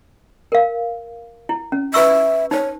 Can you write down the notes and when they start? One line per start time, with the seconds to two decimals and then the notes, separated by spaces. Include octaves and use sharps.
0.52 A#4 F5
1.49 E4
1.72 C#4
1.94 B4 E5 C#6 E6
2.51 D#4 C5 C#5